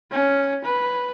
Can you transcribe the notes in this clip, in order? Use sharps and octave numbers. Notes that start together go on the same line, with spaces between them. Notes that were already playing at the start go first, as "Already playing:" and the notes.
C#4
B4